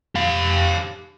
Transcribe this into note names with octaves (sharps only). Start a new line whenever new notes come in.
G4 F5